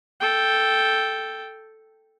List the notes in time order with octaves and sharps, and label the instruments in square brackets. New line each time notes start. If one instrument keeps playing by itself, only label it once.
[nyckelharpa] A4 G5